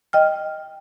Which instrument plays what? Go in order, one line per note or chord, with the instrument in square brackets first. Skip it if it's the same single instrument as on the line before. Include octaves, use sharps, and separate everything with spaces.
[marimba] D#5 G5 F6